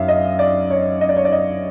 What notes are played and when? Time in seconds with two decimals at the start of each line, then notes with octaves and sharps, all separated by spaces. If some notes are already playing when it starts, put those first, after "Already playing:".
Already playing: F#2 F#3 E5 F5
0.08 D#5
0.39 D5
0.71 C#5
1.01 D#5
1.09 D5
1.17 C#5
1.25 D5
1.32 D#5